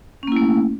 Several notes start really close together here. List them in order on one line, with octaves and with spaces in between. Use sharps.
C#4 A#3 E4 A3